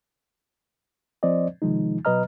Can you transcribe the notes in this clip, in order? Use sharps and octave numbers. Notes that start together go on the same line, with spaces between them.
F3 C4 C5 D5 D#5
C3 D#3 F3 G#3 D#4
B2 F#3 B4 D#5 A#5 F6